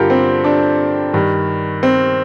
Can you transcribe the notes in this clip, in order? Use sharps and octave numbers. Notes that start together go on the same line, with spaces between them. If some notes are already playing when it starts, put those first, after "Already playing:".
Already playing: G2 D3 F4 G4 A4 A#4
C4
D4
G2 D#3
C4